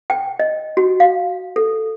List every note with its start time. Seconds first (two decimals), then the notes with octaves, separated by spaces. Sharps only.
0.10 G5
0.39 D#5
0.77 F#4
1.00 F5
1.56 A4